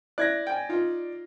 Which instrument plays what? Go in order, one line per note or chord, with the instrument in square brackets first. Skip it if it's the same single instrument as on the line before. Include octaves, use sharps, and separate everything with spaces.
[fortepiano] E4 F#6 [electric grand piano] D5 G#6 A#6
[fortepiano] G5 G#5
D#4 F4